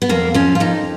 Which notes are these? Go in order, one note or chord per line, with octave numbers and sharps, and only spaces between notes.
B3
F2 A#3
F3 C#4
F4
F2 D#4